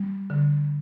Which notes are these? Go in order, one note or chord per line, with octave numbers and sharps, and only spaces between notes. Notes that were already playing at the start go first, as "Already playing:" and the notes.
Already playing: G3
D3